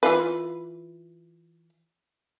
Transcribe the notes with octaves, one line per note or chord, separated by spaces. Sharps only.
E3 F4 B4